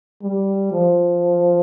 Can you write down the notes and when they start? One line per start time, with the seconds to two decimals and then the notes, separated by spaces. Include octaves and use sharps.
0.22 G3
0.72 F3